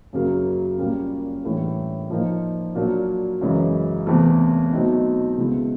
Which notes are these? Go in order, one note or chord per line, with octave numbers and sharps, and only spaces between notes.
F#2 C#3 F#3 A#3
A#2 G3 A#3 C#4
A2 E3 G3 A#3 D4
A#2 F3 A#3 D#4
A#2 F#3 A#3 D4
F#2 C#3 E3 G#3
E2 C3 E3 A3
B2 F#3 A3 C4 D#4
C#2 B2 G#3 B3 E4